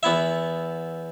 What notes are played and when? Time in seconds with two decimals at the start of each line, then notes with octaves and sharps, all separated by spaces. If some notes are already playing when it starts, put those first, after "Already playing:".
0.03 E2 B3 E4 E5